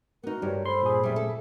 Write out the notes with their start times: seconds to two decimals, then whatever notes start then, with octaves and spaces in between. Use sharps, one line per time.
0.23 B3 D#4 F#4 A#4
0.42 G2 G3 C#5
0.66 A4 C5 B5 C6
0.83 A#2 G#4
1.03 F#2 G3 E5
1.16 A4